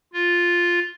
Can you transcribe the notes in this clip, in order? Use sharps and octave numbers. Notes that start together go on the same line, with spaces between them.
F4